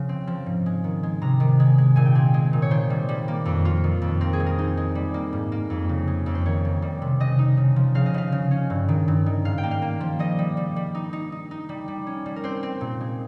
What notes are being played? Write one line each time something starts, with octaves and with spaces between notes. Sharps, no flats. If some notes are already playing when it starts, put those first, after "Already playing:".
Already playing: C#3 F3
C4
F3
G#2
G#3
D#3
G#3
C3 A#5
D#3
G#3
G#3
A#2 G#5
G5
C4 G#5
G#3
A#2
C#5
D#3 C5
G3
G3
A#3
F2
F4
D#3
F2
C4 A#4
G#4
G#3
A#4
D#4
G#3
G3
A#3
G#2
A#3
F2
C#3
G#3
F2
C5
D#3 C#5
D#3
G3
C3
C#3 D#5
D#4
C#3
F3
C#3 F5
D#5
C#3 F5
C#3
C#4
G2
D#3
G2
D#3
G#2 F5
G5
A#3
F5
A#3
F3
G3 D#5
G3
G3
G3
D#4
D#4
D#4
D#4
G3
G3
C#4
G3
A#4
C4 C5
C4
A#2
G#3